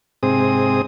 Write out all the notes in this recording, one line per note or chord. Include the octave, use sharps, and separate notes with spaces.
G#2 C3 C4 G#4 D#6